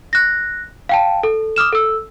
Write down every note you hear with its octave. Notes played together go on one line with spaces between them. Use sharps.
F#6 A#6
F5 G5 A5
A4
D6 D#6 F6 E7
A4 E6